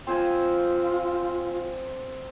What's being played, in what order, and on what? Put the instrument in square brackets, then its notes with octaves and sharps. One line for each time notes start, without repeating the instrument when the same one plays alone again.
[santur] C4 C5 G#5 [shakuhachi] F4